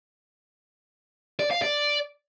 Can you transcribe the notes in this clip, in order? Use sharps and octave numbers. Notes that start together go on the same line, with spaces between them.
D5
F5
D5